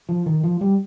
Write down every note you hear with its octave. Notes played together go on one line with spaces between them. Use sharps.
F3
D#3
F3
G3